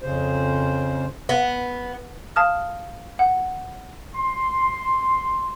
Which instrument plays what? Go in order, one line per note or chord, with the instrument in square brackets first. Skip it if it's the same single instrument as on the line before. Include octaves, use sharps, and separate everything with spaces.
[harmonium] F2 C#3 C5
[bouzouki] B3
[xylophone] F5 A5 D#6 F6
F#5
[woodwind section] C6